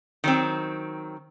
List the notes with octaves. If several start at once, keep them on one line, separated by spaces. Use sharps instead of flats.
D#3 F#3 C4